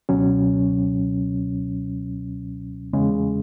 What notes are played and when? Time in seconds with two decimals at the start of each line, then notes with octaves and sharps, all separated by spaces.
0.09 C#2 B2 F#3 C#4
2.93 E2 C#3 G#3